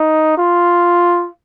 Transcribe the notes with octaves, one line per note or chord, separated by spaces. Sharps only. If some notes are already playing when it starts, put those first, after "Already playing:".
Already playing: D#4
F4